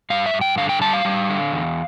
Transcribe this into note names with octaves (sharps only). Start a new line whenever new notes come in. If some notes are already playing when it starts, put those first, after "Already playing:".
G2 F5
E5
G2
G5
D3 F5
G5
G3 A5
F5
G3
D3
E2